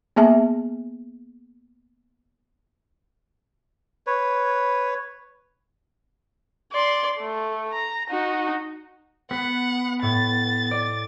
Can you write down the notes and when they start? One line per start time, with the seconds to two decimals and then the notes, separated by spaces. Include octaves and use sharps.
0.16 A#3 B3 G#4 E5 A5
4.07 B4 C#5
6.72 D5 C6
7.20 A3
7.72 A#5
8.10 D#4 F#4
9.31 B3 F#5 B6
10.02 A2 A6
10.71 D5